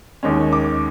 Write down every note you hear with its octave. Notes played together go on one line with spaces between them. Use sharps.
D#2 D#3 G#3 C#4
D6